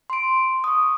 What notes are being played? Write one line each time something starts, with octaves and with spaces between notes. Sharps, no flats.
C6 D7
C#6 D#6